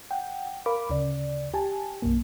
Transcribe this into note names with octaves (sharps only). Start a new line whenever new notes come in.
F#5 G5
A#4 F5 B5 D6
D2 C#3 D5
G4 G#5 A5
B1 F#2 A#3